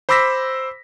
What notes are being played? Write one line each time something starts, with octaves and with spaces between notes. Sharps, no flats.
C5 B5 D6 E6 A#6 B6